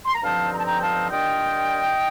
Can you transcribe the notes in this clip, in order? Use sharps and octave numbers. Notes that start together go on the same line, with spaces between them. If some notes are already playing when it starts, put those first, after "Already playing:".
C6
A#5
G2 D3 F3 C4 D#4 F5 A5
A#5
A5
G5 A#5
G5
F5 A5
A#2 G3 D4 F4 D#5 G5